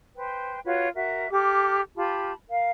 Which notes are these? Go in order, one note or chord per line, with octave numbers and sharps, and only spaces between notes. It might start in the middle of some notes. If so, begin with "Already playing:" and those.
B4 C5 G5
F4 F#4 B4 C#5
F#4 A#4 E5
G4 A4 D6 F6
F4 G4 A5 B5
A#4 F5